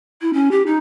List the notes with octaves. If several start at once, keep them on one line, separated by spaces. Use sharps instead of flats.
E4
C#4
G4
D#4